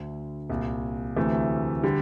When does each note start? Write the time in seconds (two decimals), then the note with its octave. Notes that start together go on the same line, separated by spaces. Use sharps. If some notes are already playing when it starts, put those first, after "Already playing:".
Already playing: D2 D3
0.50 C2 A#2
1.16 D2 C3 E3 A3
1.83 D3 G3